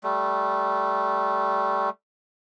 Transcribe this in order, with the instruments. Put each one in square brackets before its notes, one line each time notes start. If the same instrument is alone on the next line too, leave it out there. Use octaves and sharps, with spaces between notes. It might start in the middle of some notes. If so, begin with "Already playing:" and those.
[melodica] G3 A3